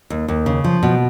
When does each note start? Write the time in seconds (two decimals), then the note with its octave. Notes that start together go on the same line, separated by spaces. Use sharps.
0.10 D#2
0.28 D#2
0.46 C#3
0.64 F3
0.83 B2